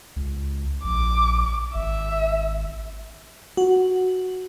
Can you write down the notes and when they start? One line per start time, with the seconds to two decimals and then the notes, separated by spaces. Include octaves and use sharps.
0.16 C#2
0.84 A#1 D6
1.75 G#1 E5
3.57 F#4